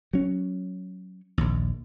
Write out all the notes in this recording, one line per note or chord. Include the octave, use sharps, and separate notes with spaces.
F#3 C#4
A#1 D#2